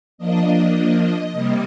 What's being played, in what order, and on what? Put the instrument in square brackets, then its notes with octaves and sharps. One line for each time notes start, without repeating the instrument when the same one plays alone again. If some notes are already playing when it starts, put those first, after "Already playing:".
[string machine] F3 A#3 D4 D#5
C3 G3 A#3